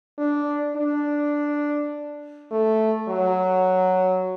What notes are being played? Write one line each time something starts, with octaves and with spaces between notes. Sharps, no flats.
D4
D4
A3
F#3